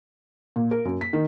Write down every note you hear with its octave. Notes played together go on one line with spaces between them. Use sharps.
A#2
A#4
F#2
B6
D#3